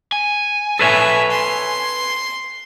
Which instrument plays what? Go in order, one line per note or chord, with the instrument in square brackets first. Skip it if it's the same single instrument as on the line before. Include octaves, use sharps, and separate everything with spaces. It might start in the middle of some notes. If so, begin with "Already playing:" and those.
[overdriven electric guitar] G#5
[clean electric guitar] A4 B4 C#5 [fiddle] E5
[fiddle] C6